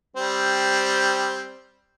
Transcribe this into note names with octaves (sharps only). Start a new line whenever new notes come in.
G3 C4